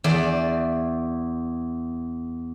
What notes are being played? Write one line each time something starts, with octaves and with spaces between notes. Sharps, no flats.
E2 D5